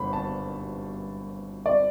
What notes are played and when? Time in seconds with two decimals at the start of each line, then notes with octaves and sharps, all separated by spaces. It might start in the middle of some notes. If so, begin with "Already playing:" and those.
Already playing: G1 G2 B5
0.13 A5
1.66 D5